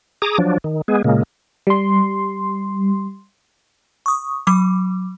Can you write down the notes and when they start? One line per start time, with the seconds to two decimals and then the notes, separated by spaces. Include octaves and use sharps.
0.22 G#4 A#5 D6 D#6
0.38 F3 F#3 D4
0.64 D#3
0.88 G#3 B3 G#4
1.04 A#2 C#3 G#3 A#3
1.67 G3 C6
4.06 C#6 D#6
4.47 F#3 D6